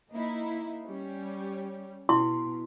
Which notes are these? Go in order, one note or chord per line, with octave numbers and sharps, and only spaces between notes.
A#3 D#4 E4
G3 C#4
B2 E4 C6